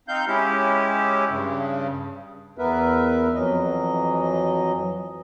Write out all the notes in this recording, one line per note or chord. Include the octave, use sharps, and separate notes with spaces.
C4 D#4 F5 G6
G#3 C#4 E4 G4
G2 C#3
E2 B3 A#4 B4 E5
F2 E3 F#3 D#5